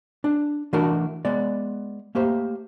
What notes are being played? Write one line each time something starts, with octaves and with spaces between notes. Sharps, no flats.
D4
E3 A3 D4 F#4 A#4 A5
G#3 B3 D5
A3 A#3 G4 C5